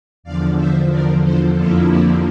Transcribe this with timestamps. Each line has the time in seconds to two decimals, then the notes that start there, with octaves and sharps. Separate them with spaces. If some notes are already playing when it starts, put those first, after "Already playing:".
0.23 E2 D3 F3 D5 F5
0.56 C5 E5
0.89 A#4 D5
1.22 A4 C5
1.55 F2 D3 F3 A#3 E4 F4 A4
1.88 E4 G4